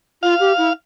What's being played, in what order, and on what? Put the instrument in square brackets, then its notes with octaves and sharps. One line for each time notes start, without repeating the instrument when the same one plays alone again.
[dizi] F4 [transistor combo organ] F5
[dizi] G4
E4